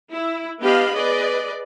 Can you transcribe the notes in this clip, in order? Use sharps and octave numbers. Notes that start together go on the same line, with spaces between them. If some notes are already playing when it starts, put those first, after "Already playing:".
E4
B3 D4 G4 D#5 F5 B5
G#4 B4 D5 D#5